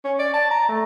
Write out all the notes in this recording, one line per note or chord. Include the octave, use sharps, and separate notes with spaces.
C#4
D5
A5
A#5
A3